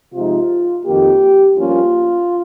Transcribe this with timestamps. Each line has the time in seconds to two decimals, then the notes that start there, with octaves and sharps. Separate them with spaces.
0.14 C3 F3 G#3 D#4 F4
0.85 F2 D#3 A#3 G4
1.56 G2 F3 A#3 C#4 F4